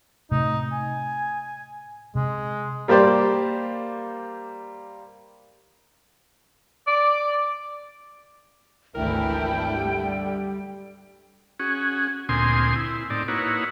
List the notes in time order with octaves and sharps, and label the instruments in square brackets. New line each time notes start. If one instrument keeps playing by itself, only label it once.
[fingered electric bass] A2 C3 A3 [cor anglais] D#4
[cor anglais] G#5
[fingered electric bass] C3 [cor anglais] G#3
[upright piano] G3 A#3 G4 C5 D5
[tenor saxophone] D5
[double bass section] G#1 D2 E3 [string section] A3 E4 A4 [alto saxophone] A#4 [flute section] G5
[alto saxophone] D3 [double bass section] G3
[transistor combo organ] C#4 F#4 G#4
D2 A#2 C4 G#5 C6 D#6
E4
A2 C4 D#4 D5
A#3 D#4 E4 F#4 B4 C#5